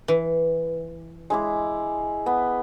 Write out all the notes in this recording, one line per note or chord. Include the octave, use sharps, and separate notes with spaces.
E3
G#3 E4 D6
B3